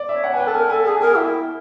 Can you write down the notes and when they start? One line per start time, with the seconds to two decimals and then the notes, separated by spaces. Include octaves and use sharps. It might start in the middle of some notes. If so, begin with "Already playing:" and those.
Already playing: D5
0.09 C#5 E5
0.24 F#5
0.33 B4 G#5
0.40 G5
0.46 A4 A5
0.54 A#4 G#5
0.70 A4 G#5
0.85 G#4 A5
1.00 A#4 G#5
1.15 E4 G5